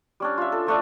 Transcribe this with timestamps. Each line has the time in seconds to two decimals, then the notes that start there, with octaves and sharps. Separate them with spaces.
0.20 G3 C#4 D4
0.38 F4 E5
0.52 A4
0.67 F3 A3 D4 C#6